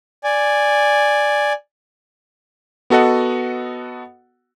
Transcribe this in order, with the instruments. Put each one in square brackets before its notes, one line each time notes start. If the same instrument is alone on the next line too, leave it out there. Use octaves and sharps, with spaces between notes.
[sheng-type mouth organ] D5 G#5
[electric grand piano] B3 F#4 A4 D#5 F#5